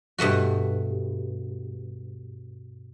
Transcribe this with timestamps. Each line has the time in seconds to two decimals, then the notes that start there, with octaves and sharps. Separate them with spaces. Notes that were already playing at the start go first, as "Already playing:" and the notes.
0.18 G2 B2 A3 F#4